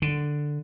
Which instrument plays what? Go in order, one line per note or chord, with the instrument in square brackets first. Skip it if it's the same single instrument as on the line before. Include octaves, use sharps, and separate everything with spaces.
[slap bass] D3